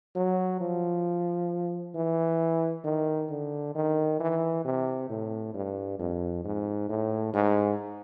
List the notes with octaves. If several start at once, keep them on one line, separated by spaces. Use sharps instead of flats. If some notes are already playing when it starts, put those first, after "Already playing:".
F#3
F3
E3
D#3
D3
D#3
E3
C3
A2
G2
F2
G#2
A2
G#2